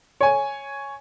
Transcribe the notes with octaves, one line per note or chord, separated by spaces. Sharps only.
C#5 G#5